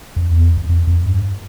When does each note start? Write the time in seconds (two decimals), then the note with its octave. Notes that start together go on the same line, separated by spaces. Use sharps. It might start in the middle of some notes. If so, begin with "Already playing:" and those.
0.16 F2
0.30 E2
0.44 F2
0.57 F2
0.69 F2
0.87 F2
1.06 G2